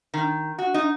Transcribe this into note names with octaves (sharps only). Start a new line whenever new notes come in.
D#3
F#4
D#4